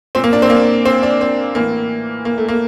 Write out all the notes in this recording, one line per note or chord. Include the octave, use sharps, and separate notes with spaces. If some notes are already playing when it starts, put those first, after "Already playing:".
A#2 C4
A#3
D4
C4
A#3
C4
D4
C4
A2 E3 A#3
A#3
A3
A#3